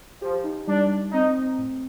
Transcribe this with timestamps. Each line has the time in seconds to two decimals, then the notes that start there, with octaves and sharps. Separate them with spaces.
0.21 F3 G4
0.44 D#4
0.67 G3 D4
0.90 G3
1.12 C4 D#4
1.37 C4
1.58 A2